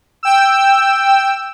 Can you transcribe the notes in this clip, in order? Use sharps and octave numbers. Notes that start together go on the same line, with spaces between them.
G5 E6